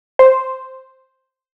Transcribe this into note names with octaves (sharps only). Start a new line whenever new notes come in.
C5